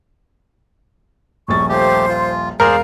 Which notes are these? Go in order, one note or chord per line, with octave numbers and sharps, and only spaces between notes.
D#1 A#1 C#6 A6
F3 A3 G4 C5
F4
E1 G#4 A#4 C5 D5 F5